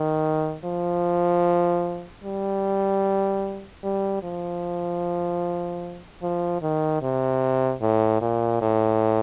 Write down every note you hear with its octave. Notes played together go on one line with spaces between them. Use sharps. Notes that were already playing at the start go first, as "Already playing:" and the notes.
Already playing: D#3
F3
G3
G3
F3
F3
D#3
C3
A2
A#2
A2